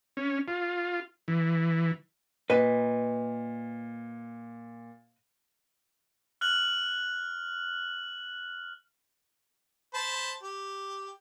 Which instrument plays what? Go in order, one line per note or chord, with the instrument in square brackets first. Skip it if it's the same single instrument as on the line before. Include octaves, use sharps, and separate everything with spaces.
[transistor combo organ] C#4
F4
E3
[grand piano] A#2 [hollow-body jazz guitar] B4 D#5
[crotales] F6 F#6 F#7
[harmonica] C5 A5 B5
G4